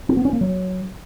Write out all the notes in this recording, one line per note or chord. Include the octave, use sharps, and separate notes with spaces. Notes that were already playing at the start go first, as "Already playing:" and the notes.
C4
B3
C#4
A#3
F#3